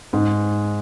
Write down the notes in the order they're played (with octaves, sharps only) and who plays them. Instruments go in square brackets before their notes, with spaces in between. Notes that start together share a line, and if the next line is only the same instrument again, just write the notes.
[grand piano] G#2